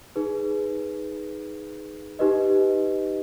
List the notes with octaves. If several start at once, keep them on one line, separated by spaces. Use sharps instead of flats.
D#4 G#4 B4
D#4 G4 B4 D#5